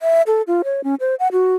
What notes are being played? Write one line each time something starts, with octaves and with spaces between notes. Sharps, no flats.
E5
A4
F4
C#5
C#4
C5
F#5
F#4